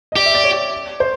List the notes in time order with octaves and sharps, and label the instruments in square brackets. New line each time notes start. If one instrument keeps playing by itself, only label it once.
[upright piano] D#5
[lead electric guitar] G4 [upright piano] D5
[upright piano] E5
D5
C#5
C5